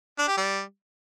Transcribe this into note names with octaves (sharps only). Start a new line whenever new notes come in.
D4
G4
G3